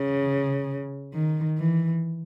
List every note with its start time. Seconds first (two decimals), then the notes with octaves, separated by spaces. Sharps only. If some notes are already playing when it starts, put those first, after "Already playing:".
Already playing: C#3
1.13 D#3
1.58 E3